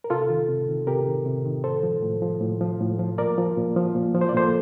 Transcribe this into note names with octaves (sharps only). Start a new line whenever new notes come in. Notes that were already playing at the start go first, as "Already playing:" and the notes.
A#4
C3 F4 A4
D#3
C3
D#3
C3 G4 A#4
D#3
C3
D#3
A2 A4 C5
F3
A2
F3
A2
F3
A2
F3
A#2 A#4 D5
F3
A#2
F3
A#2
F3
C5
D5
A#2 A4 C5